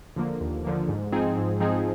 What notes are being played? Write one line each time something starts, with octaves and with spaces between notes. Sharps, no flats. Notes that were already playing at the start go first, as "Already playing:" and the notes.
D3 F3 A#3
D#2
D3 F3 A#3
G#2
F3 C4 D#4 G#4
G#2
F3 C4 D#4 G#4